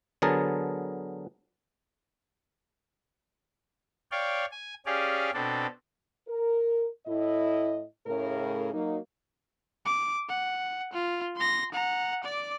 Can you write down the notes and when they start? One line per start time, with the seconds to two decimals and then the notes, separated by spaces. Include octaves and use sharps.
0.22 D3 F#3 B3 G#4 A#4 A5
4.11 C#5 D5 F5 G5
4.51 G#5
4.86 C#4 G4 G#4 D5 F5
5.34 B2 C4 D4 A4
6.28 A#4
7.06 A2 E4 D#5
8.07 A2 C#3 A#4
8.73 F#3 A#3 D#4
9.85 D6
10.28 F#5
10.93 F4
11.36 C6 A#6
11.72 F#5 A#5
12.24 D5 D6